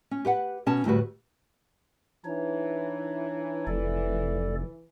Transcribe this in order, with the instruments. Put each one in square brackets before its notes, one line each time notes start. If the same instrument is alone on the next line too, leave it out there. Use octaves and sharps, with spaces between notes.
[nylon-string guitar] C#4
G4 B4 F#5
B2 C#4 G#5 A5
D2 A2 G3 F#4 B4
[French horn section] E3 [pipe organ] D4 D#4 C#5
[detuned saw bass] F1 [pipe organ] A4 D5